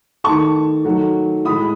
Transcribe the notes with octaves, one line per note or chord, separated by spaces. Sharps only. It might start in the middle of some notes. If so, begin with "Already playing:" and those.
D#3 A3 A5 C#6
D#3 F#3 A3
A2 G#3 B5 D#6